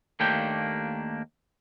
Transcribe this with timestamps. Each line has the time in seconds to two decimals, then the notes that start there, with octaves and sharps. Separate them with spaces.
0.20 D#2 A3 A#3 D4 G4 G5